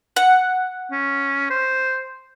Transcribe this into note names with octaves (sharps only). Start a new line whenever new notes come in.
F#5
C#4
C5